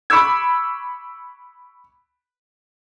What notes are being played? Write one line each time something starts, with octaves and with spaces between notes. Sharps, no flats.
B5 C#6 D6 E6 G#6